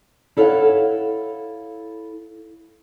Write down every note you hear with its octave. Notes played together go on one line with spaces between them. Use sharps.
E4 A4 C#5 F5 F#5